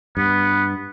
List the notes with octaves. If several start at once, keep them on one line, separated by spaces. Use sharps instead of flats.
G2 B3